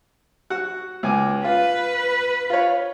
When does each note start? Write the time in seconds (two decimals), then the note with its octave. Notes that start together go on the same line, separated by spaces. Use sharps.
0.50 F#4 F#5
1.03 C#2 G#5 D6
1.44 F4 B4
2.50 F4 C#5